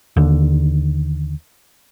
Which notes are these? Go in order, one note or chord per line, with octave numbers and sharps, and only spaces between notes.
D#2 D3